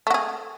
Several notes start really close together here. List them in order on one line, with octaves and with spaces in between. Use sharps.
A3 F#4 G#4